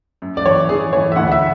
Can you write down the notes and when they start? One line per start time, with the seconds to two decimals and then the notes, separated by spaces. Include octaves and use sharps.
0.22 F#2
0.37 D5
0.45 E3 C#5
0.69 E3 G#4
0.93 E3 C#5
1.12 E5
1.16 D2 F#5
1.28 F#5
1.32 E5